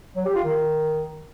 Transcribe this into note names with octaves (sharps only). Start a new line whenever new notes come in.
F#3
G4
F4
D#3